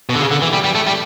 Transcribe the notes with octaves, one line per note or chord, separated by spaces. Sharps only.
B2
D3
C#3
D3
E3
G3
G3
A3
G3